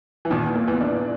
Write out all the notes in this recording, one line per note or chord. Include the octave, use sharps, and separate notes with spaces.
E3
D#2 A#2 D#3
A#3
E2 E3
D4